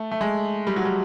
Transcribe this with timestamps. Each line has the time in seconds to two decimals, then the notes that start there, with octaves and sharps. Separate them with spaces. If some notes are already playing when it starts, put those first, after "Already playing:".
Already playing: A3
0.11 A3
0.21 G#3
0.67 G3
0.76 F#3
0.85 G3